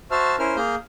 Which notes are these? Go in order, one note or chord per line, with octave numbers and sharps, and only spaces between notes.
F#4 C5 E5 A5 F6
C#4 E4 A#4 C5 F6
A#3 G#4 A#5 F6 G6